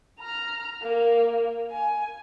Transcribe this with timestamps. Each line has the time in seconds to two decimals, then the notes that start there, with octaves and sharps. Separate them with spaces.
0.20 A#5 F6
0.82 A#3
1.71 G#5